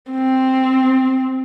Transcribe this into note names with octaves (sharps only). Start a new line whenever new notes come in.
C4